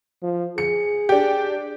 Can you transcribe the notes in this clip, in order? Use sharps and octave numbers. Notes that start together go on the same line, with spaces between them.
F3
G#4 C#7
D4 G4